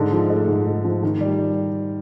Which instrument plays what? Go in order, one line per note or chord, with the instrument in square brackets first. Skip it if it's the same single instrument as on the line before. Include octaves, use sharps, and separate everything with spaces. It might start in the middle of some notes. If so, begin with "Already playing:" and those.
Already playing: [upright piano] G#2 D3
F3
A3
G#2
G#2
F3
D#3
G3